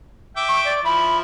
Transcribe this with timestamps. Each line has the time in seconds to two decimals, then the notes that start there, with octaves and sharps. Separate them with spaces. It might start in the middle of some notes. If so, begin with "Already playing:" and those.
0.37 E5 G5 D6
0.48 C#6
0.65 D5
0.85 F3 E4 B5